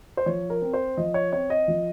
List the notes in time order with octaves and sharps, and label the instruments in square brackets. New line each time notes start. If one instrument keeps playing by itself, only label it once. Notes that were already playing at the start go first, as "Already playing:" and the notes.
[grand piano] C5
F3 C#5
A#4
C4
C5
F3 D#5
C#5
C4 C#5
D#5
F3